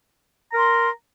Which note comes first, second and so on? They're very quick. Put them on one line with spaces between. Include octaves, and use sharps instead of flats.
A#5 A#4 C6